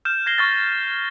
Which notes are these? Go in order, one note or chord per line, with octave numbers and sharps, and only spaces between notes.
F6 G6 E7
G#6 A#6 C7 G7
C#6 F6 A6